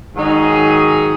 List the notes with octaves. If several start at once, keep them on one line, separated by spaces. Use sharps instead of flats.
G#2 D#3 F#3 D#4 G#4